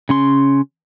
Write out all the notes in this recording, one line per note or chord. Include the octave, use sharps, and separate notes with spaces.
C#3 C#4 C6